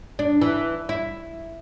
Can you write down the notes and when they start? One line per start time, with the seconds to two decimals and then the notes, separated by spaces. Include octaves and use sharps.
0.19 D4
0.42 E3
0.89 E4